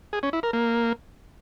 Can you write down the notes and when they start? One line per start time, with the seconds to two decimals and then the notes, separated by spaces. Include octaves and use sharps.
0.13 G#4
0.23 C#4
0.33 E4
0.43 A#4
0.53 A#3